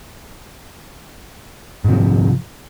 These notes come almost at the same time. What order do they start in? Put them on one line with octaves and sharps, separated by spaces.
G#2 C3 F3